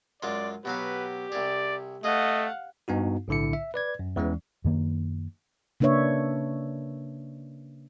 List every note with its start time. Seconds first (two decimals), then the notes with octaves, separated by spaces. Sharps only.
0.23 F#2 G#3 F4 D5
0.65 B2 F#3 G4 B4 F5
1.32 C2 G#4 D5
2.04 A3 G#4 D#5 F5 F#5
2.88 G2 B3 D#4 F#4
3.28 B1 A2 D3 E4 C#7
3.53 E5
3.74 B4 D5 G#6
3.99 F#2
4.16 E2 E3 G#3 C#4
4.65 F#2 D#3 A#3
5.80 C#3 A#3 D4 B4 C#5 E5